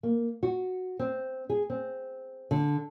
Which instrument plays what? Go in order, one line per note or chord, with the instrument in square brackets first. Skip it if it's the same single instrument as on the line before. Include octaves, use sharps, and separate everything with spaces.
[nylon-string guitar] A#3
F#4
C4
G#4
C4
D3